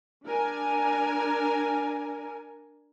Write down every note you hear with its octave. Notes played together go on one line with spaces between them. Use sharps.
D4 A#4 G#5